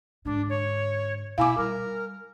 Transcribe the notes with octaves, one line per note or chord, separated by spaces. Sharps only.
G#2 D3 D4
C#5
B2 E4 F5 G#5 D6
G3 A#4